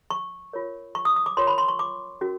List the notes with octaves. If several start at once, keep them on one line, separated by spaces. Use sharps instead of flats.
C#6
F4 A#4 C#5
C#6
D#6
D#6
D6
F4 A#4 C#5 C6
B5
C6
C#6
D6
C#4 F#4 A#4